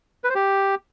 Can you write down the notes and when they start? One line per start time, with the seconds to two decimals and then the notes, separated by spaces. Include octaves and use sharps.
0.24 B4
0.30 C5
0.35 G4